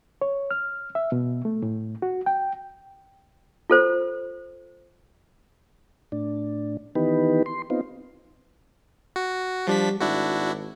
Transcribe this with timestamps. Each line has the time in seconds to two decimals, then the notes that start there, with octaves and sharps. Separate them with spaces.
0.22 C#5
0.51 F6
0.95 E5
1.12 B2
1.45 A3
1.62 A2
2.02 F#4
2.26 G5
3.70 F4 A4 C5
6.12 A2 D4
6.95 D#3 E3 B3 D#4 G4 B4
7.46 C6
7.70 B3 C4 D#4 F4
9.16 F#4
9.67 F3 G3 D4 B6
10.00 G#1 D4 E4 F#4